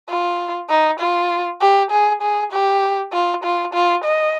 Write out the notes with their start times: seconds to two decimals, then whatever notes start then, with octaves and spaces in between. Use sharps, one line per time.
0.09 F4
0.69 D#4
1.00 F4
1.61 G4
1.91 G#4
2.22 G#4
2.52 G4
3.13 F4
3.44 F4
3.74 F4
4.04 D#5